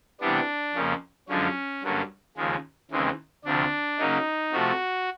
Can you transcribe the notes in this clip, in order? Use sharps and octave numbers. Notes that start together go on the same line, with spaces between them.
C3 E3 G3 B3 D4
F2 C#3 F3 A#3 C#4
F#2 D3 F3 G#3 C#4
G2 D3 F#3 A#3 C#4
D#2 C#3 F3 G#3
D#2 C#3 E3 G#3 C4
D2 C3 F3 D4
C#3 F#3 A#3 C#4 D#4
C3 F3 A3 F#4